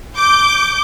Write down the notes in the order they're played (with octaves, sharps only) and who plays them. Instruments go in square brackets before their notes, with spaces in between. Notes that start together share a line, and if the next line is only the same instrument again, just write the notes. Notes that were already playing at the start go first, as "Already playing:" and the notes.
[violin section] D6 G6